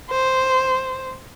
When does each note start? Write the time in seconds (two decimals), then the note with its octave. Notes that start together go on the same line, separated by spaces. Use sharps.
0.10 C5